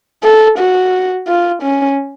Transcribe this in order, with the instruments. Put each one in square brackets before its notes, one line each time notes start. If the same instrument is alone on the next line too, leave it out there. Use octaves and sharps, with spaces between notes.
[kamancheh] A4
F#4
F4
C#4